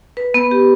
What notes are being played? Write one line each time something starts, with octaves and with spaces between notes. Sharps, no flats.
B4
B3
G4